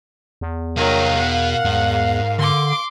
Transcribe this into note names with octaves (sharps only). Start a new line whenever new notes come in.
E2
C2 D#3 F#3 D#4 A#4 F5
B2 F#5
E2 G#2
D3 C6 D6